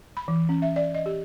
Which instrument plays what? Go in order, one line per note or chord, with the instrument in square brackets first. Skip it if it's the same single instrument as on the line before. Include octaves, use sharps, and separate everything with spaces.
[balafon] B5
E3
C#4
E5
D5
D#5
G4